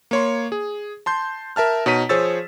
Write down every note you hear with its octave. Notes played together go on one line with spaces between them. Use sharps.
A#3 C#5 C6
G#4
A5 C6 G6
A#4 E5 A5 F6
B2 D#4 C#5 A#5 B6 D#7
F3 G#4 C5 C#5 E6 A6